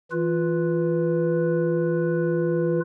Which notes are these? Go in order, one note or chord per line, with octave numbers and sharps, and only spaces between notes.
E3 F4 B4